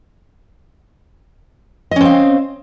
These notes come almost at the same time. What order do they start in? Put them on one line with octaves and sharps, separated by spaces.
D#5 C#4 C4 F5